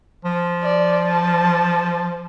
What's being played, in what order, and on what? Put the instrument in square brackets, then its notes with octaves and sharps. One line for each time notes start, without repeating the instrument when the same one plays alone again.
[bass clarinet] F3
[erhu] D5
A5